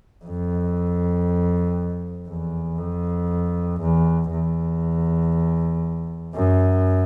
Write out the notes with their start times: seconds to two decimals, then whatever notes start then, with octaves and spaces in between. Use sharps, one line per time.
0.25 F2
2.29 E2
2.78 F2
3.81 E2
4.32 E2
6.35 F#2